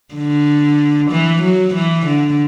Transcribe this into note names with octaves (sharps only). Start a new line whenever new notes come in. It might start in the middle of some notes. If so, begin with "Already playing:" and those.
D3
E3
F#3
E3
D3